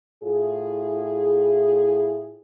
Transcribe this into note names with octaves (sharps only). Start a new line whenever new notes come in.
A2 E4 F4 G#4